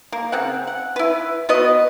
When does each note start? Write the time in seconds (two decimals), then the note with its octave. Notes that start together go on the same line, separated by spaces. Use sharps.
0.12 A#3
0.32 C#3 C4 F#5
0.67 F#5
0.96 E4 B4
1.49 B3 F#4 B4 D#5